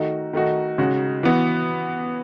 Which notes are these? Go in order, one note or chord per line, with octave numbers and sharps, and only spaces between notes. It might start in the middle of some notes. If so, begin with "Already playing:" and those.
Already playing: D#3 A3 D#4 F#4
D#3 A3 D#4 F#4
C#3 G#3 D#4 F#4
E3 B3 F#4